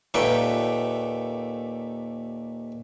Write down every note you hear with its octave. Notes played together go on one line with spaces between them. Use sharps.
D#2 A#2 A3 G4 B4 G5